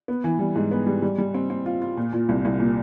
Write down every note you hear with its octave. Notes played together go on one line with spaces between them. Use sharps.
B3
E3
G3
G#2
B3
G3
G3
G3
C4
C4
F4
F4
A#2
A#2
C2
C2
A#2